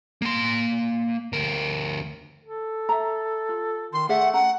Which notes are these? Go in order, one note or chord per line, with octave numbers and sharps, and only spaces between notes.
A#3 C6
D2 A#4
A4
E5 A#5
F4
D#3 C6
A3 G#4 D5 E5 F#5
C#4 F#5 A#5